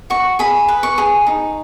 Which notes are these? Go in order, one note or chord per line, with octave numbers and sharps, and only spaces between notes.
F#4 C#6
G#4 B5
B4
C#6
G#4
D#4